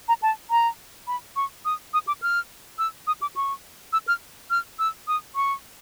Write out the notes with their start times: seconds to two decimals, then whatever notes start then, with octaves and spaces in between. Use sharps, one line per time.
0.08 A#5
0.22 A5
0.51 A#5
1.07 B5
1.36 C#6
1.65 D#6
1.94 D#6
2.07 D6
2.22 F6
2.78 E6
3.07 D#6
3.22 D6
3.36 C#6
3.93 E6
4.08 F6
4.50 F6
4.79 E6
5.08 D#6
5.36 C#6